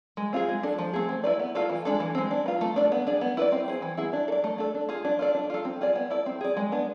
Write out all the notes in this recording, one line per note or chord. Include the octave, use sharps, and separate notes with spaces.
G#3
C4 F4 G#4
G#3
D4 A4
F3
A3 C4 G#4
C4
E4 B4 D5
B3
F4 A4 D5
E3
G#3 D4 A4
E3
G#3 C4
D4
F4 B4
A3
D4 A4 D5
B3
D4 G#4 D5
B3
E4 B4 D5
C4
G#4 C5
E3
B3 E4 G#4
D4
A4
D5
A3
D4 A4
D4
F4 G#4
D4
F4 A4 D5
D4
F4 A4
C4
F4 G#4 D5
B3
E4 A4 D5
C4
G#4 D5
G#3
B3 D4